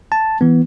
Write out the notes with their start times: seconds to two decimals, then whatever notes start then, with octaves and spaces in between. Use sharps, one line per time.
0.12 A5
0.41 E3 B3